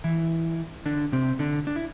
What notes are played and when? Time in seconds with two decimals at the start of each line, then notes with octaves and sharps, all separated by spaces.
0.04 E3 E4
0.86 D3 D4
1.12 C3 C4
1.39 D3 D4
1.67 D4
1.76 E4